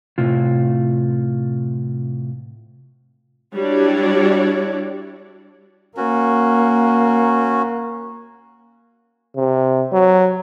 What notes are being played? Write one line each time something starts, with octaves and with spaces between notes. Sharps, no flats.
A2 C3 F4
G3 D4 E4 F#4 C#5 D5
A#3 C#4 F#4
C3
F#3